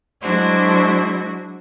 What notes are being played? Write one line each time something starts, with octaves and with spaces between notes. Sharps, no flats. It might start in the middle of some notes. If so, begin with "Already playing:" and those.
F#3 G#3 D4 E4 F#4 C5